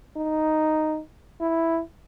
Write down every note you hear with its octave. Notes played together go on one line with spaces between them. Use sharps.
D#4
E4